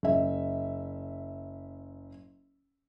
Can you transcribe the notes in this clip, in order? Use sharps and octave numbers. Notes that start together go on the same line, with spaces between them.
F#1 E5